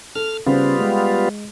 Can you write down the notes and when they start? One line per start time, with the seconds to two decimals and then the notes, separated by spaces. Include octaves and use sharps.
0.15 A4 F6
0.46 C#3 G3 B3 F4 C5
0.79 G#3